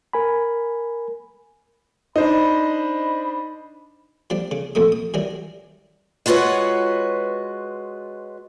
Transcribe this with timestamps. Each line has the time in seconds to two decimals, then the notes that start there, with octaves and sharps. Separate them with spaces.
0.13 A#4 G#5 B5
2.16 D4 D#4 C5 D#5 B5
4.30 F3 G3 D4
4.51 C#3
4.75 A#1 F2 A3 D#6
4.92 D#6
5.14 D#3 E3 F#3 G3
6.26 G#3 F4 F#4 B4 C#5